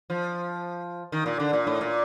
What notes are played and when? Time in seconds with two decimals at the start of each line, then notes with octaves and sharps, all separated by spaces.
0.10 F3
1.12 D#3
1.26 A#2
1.39 D3
1.53 A#2
1.67 A2
1.81 A#2